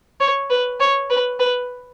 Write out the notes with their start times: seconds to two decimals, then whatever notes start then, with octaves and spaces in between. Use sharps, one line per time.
0.20 C#5
0.50 B4
0.80 C#5
1.10 B4
1.39 B4